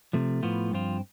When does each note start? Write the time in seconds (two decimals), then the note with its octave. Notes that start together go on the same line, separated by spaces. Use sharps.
0.13 C3 F3 A3
0.43 A2 F3 B3 F4
0.71 G2 F3 C4 F4